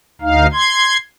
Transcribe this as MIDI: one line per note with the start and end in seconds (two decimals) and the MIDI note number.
0.21 0.47 38
0.21 0.47 63
0.21 0.47 77
0.53 0.97 84
0.53 0.97 92